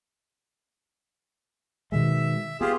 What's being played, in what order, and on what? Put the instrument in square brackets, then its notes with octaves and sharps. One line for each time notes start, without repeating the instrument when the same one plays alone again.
[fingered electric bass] B2 D#3 G#3 [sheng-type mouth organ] E5
[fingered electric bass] B3 [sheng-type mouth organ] F4 G4 G#4